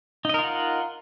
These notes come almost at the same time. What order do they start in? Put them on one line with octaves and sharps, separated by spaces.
D#4 D#5 A#4 F4 F#5